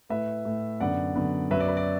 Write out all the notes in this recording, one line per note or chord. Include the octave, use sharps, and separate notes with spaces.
A2 A3 B4 E5
A2 A3
F#2 D3 B3 D5 F#5
F#2 D3 B3
F#2 F#3 B3 B4 E5
D5
B4
D5